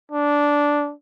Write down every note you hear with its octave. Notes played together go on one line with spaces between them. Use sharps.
D4